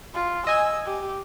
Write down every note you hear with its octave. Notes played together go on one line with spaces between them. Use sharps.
F4
D#5 G#5 E6
G4